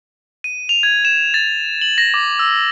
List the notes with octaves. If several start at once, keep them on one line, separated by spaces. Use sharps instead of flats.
D#7
F7
G#6
E7
A6
F#7
A#6
D6
E6